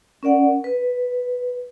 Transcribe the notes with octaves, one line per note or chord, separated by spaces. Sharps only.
C#4 A#4 D5 F#5
B4